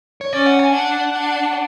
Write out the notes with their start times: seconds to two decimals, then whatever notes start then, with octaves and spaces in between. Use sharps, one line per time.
0.21 C#5
0.33 C#4 D5
0.46 F#5
0.59 G#5
0.72 D4 F#5
1.12 D4